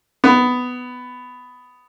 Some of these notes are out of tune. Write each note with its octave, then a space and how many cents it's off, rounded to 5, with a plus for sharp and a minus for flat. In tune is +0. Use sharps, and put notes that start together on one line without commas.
B3 +10